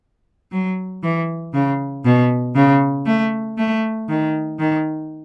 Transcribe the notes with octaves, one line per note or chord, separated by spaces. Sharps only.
F#3
E3
C#3
B2
C#3
A3
A3
D#3
D#3